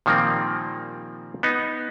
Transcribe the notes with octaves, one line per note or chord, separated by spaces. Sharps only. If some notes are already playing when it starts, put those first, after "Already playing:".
A#2 D#3 F3 G3 A#3 C4
B3 D#4